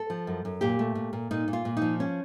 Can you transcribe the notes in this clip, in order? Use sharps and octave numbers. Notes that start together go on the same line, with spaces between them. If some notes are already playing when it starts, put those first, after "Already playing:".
Already playing: A4
F3
F#2
F#2
A#2 G4
A3
A#2
A#2
A#2 D#4
A#2
F4
A#2
D#4
F3
C#4